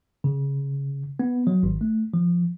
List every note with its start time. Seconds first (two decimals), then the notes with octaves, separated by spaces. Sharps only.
0.24 C#3
1.20 B3
1.47 F#3
1.63 G#1
1.81 A3
2.14 F3